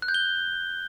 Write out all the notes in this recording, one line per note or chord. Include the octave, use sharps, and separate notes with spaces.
F#6
G6
G7